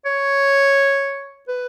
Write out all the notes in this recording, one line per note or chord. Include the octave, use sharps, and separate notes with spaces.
C#5
B4